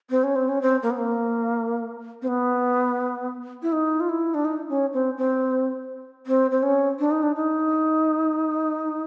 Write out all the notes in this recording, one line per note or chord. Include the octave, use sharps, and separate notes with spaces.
C4
C#4
C4
C#4
C4
A#3
B3
A#3
C4
B3
E4
D#4
F4
E4
D4
D#4
C#4
C4
C4
C4
C4
C#4
D4
D#4
D4
D#4